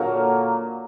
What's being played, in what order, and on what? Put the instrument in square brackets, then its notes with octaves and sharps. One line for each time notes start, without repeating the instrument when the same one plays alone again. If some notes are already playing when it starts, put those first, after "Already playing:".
Already playing: [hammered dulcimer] A#2 D3 F#3 A#3 A#4